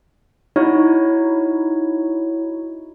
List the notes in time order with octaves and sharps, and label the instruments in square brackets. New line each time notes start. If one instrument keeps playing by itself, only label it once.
[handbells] D#4 E4 F#4 C#5